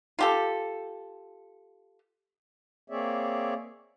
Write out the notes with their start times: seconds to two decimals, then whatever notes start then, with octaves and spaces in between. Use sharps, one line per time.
0.19 F4 G4 A4
2.90 A#3 C4 G#4 C#5 D5 E5